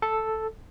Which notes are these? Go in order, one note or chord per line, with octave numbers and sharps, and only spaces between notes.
A4